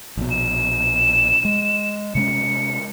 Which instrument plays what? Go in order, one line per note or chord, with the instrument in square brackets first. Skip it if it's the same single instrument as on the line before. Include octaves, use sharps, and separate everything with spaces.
[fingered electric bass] A#1 B2
[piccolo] E7
[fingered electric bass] G#3
[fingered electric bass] C3 G#3 C#4 [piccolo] C#7